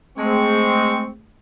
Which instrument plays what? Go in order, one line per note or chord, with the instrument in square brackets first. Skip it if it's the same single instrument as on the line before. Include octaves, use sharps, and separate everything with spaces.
[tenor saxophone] G#3 [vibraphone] A3 G#4 [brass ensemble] C4 [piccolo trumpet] C#6